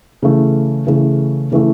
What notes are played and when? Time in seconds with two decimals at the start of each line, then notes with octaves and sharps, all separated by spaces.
0.22 C#3 E3 A3
0.87 C#3 E3 A3
1.52 C#3 E3 A3